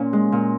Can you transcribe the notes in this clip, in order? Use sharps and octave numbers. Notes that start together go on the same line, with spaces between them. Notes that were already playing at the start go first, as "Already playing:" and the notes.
Already playing: A#2 C#4
G#3
A#2